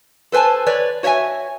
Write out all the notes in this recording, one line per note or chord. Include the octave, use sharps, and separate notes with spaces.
A4 B4 C5 G#5 A5
B4 C#5 D5
F#4 C#5 D#5 E5 G#5